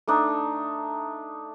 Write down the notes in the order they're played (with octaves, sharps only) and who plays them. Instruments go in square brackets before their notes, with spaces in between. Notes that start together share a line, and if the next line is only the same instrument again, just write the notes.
[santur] A3 D4 D#4